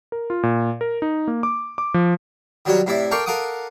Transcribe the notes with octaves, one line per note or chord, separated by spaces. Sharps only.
A#4
F4
A#2
A#4
D#4
A#3
D6
D6
F3
D#3 F#3 G3 F#4 C#5
A2 C3 E4 D5 E5
A4 A#4 F5 G5 C#6 D6
A4 A#4 F5 F#5 D6 D#6